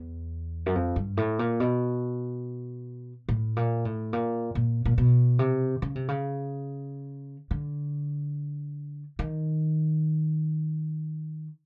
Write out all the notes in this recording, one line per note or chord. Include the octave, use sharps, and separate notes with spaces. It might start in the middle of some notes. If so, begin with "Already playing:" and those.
Already playing: E2
F#2
F2
G2
A2
A#2
B2
A2
A#2
A2
A#2
A#2
A#2
B2
C3
C#3
C3
C#3
D3
D#3